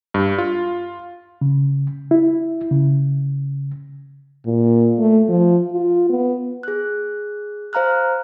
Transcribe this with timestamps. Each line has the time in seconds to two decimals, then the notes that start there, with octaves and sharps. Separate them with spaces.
0.14 G2
0.38 F4
1.41 C#3
2.11 E4
2.71 C#3
4.46 A#2
4.98 A3
5.28 F3
5.73 F4
6.09 B3
6.63 G#4 F#6
7.73 C5 F5 A#5 F6 F#6